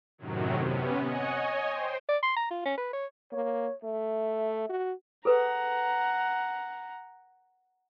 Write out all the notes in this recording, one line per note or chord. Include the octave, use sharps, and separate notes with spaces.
F#2 A2 C3 D#3 F#3
C3 B3 C#4
C#5 D#5 F#5 G#5 C#7
C#5 D#5 G#5
C5 G5 C6
D5
C6
A#5
F4
C#4
B4
C#5
A#3 C#5
A3 E5
F#4
G#4 A4 B4 F#5 A#5